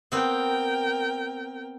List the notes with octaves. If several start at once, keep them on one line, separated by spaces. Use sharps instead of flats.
B3 C4 A#4 G5